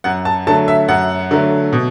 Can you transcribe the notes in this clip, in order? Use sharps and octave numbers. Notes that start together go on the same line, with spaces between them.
F#2 F#5
A5
D3 F#3 A3 A5
E5
F#2 F#5
D3 F#3 A3
B2